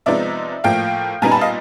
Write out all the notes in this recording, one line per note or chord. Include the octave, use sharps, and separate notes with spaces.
C3 F3 G#3 B3 D#4 D5 E5
A2 F3 A#3 F5 G5
A#2 G3 B3 D#4 G#5 A#5
A5 B5
D#5 F5